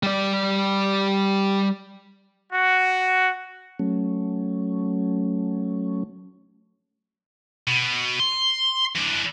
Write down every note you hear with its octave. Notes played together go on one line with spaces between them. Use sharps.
G3 D5
F#4
F#3 A3 C#4
B2
C6
E3 D4